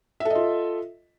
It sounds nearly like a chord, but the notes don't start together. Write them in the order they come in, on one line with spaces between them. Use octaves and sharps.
E5 A4 D#5 F4